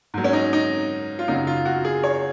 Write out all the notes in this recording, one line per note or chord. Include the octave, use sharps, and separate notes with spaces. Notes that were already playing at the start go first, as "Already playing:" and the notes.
G#2 F#3
C#4
D#4
D#4
F4
F#2 C#3 F#3 D#4
F4
F#4
G#4
C#5